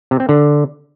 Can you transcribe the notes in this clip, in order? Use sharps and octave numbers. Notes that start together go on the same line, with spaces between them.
C3
C4
D3